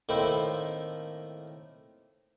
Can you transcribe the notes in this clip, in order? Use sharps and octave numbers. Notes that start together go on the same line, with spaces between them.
A2 D#3 A#3 C4 E4